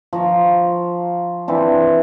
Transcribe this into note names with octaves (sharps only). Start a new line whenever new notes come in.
F3 A#5 C#6
E3 C4 D4